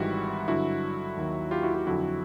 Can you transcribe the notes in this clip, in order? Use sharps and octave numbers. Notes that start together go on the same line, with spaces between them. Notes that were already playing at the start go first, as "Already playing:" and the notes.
Already playing: G#1 G#2 E3 G3 E4 F#4
G2 D3 F#3 E4 F#4
D#2 D#3 F#3
F4 G4
E4 F#4
F4 G4
F2 D3 F#3 E4 F#4